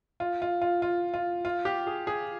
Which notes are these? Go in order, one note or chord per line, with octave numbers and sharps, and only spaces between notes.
F4
F4
F4
F4
F4
F4
G4
G#4
G#4